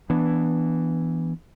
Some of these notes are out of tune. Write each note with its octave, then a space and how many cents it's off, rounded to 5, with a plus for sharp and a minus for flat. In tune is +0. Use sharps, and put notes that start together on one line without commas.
E3 +0 B3 -10 D4 +0